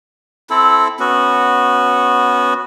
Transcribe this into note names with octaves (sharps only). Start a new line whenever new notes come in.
C4 E4 A4
B3 C#4 F#4